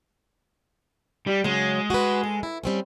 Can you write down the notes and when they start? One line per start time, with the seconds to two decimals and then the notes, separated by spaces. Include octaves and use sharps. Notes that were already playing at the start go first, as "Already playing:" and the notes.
1.27 G3
1.44 C#3 F#3 G#3
1.90 F#4 B4
2.23 A4
2.43 E4
2.64 G3 C4 C#4